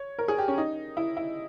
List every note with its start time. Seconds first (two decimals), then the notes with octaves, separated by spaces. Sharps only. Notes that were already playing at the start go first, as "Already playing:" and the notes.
Already playing: C#5
0.19 A#4
0.28 G#4
0.38 G4
0.48 C#4
0.58 D#4
0.97 E4
1.17 E4